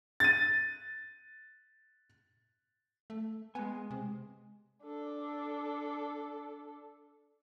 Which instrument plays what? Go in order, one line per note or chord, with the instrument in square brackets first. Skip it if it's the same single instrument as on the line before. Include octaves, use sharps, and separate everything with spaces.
[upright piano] A6 D#7
[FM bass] A3
[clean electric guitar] G#3 G#5 [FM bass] B3
[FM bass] C3
[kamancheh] D4 A4